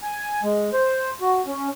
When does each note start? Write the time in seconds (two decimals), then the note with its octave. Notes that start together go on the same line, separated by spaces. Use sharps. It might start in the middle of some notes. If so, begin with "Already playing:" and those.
0.03 G#5
0.43 G#3
0.73 C5
1.21 F#4
1.46 C#4